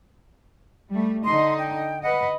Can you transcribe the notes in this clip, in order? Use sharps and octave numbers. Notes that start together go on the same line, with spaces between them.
G3 A3
D3 D#4 D#5 C6
G5
B4 D#5 F#5